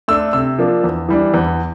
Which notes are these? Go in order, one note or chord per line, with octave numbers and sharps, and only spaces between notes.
A3 D4 E6
C3 E6
F3 A#3 D4
E2
E3 G3 D4
E2